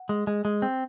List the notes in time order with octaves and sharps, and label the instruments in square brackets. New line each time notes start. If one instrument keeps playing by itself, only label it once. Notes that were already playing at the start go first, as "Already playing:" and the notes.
Already playing: [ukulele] F#5
[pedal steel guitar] G#3
G#3
G#3
C4